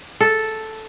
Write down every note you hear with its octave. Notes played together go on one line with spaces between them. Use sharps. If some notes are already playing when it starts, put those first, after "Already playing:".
A4